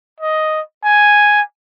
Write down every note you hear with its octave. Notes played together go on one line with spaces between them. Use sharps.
D#5
G#5